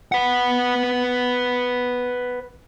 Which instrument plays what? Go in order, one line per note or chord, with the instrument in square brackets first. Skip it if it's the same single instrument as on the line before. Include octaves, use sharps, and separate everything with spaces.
[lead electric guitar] B4 F#5